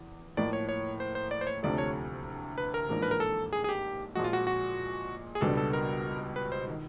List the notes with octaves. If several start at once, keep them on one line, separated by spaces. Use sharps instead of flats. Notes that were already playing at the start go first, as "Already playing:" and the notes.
Already playing: E2
A2 F3 A#3 D#4 D5
C#5
C#5
C5
C5
D5
C5
C#5
D2 C3 F3 A3 D5
C#5
B4
A#4
A1 G#2 F3 A#3 D4
B4
A#4
A4
G#4
G#4
G4
A#2 F3 G#3 F#4
F4
F#4
F#4
G#4
C#2 B2 G3 B3 D4 A4
A4
A#4
B4
C5
D#3